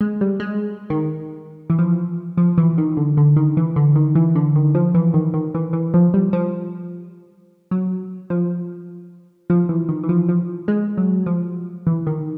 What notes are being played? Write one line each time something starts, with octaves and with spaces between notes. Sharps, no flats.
G#3
G3
G#3
D#3
E3
F3
F3
E3
D#3
D3
D3
D#3
E3
D3
D#3
E3
D3
D#3
F3
E3
D#3
D#3
E3
E3
F3
G3
F3
F#3
F3
F3
E3
D#3
E3
F3
F3
G#3
F#3
F3
E3
D#3